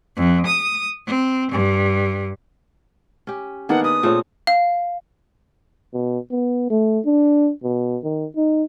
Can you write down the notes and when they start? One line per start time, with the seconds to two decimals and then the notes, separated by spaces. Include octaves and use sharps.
0.16 F2
0.47 D#6
1.07 C4
1.52 G2
3.27 C#4 G4
3.69 D#3 A#3 B3 D4 D#4 G#4 F#5
3.84 B4 D#6
4.03 A#2 A3 C4 G#4 C#5
4.47 F5
5.94 B2
6.31 B3
6.70 A3
7.05 D4
7.63 B2
8.03 D#3
8.36 D#4